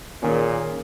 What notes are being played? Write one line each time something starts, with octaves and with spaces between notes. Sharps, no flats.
A#2 D#3 A#3 C#4 G#4